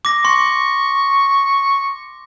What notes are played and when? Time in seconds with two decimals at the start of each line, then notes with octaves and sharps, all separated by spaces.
0.05 D6 A#6
0.25 C6 C#6